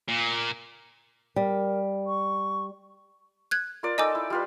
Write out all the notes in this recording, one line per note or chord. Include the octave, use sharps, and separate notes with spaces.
A#2
G3 A#4
C#6
F#6 G#6
F4 A#4 D5
D#4 A4 D5 D#5 G#5 D6
E4
G3 F4 B4